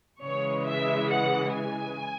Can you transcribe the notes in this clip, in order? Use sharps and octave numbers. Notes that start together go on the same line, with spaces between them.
C#3 E3 G#3 C#5
E5
F#5
G#5